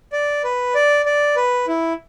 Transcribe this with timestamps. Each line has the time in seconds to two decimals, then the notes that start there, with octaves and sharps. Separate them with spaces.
0.12 D5
0.44 B4
0.75 D5
1.06 D5
1.36 B4
1.67 E4